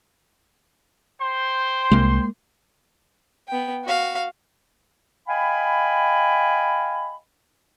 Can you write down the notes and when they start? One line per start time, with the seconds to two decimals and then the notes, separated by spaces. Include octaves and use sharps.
1.21 C5 G5 C6
1.91 C2 G#3 A#3
3.48 B3 G5
3.84 F#4 F5
5.28 D#5 F5 G5 G#5 B5